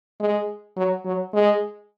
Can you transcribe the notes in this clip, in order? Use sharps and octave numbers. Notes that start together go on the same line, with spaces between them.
G#3
F#3
F#3
G#3